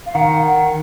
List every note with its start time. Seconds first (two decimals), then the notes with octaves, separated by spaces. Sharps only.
0.06 F5
0.15 D#3 F#5